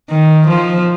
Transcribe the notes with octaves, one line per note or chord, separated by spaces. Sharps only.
D#3
F3